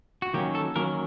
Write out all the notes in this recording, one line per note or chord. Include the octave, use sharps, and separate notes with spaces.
F#4
D#3 F#3 A#3 C#4 G4
A4
D#3 F#3 A#3 C#4 A#4